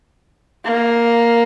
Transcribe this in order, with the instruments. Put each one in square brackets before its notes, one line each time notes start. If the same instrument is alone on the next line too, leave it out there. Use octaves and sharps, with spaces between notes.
[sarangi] A#3